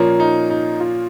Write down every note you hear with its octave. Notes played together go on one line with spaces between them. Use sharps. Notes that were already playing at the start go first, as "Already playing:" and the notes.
Already playing: A#2 F3 A#3 C#4
D#4
D#4
F4